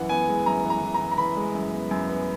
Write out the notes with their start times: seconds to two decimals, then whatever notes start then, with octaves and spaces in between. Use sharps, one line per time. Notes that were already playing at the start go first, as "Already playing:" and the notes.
Already playing: F#2 E3 F#5
0.09 B3 G#5
0.28 G#3
0.46 F#2 A#5
0.64 E3
0.70 A#5
0.82 E3
0.94 A#5
1.00 E3
1.11 A#5
1.18 E3 B5
1.36 G#3
1.55 F#2
1.72 B3
1.91 F#2
2.08 B3